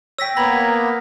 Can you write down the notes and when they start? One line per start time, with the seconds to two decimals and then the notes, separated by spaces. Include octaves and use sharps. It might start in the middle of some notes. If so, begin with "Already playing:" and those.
0.19 C#5 G5 E6 A#6 B6
0.37 A#3 B3 A#5 B5 G#6 A#6